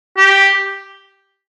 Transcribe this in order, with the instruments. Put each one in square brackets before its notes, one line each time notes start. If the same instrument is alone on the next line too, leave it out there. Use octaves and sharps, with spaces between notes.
[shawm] G4